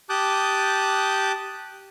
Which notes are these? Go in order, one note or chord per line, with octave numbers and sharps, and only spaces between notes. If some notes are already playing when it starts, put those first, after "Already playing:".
G4 A5 D6 D#6 F#6 G6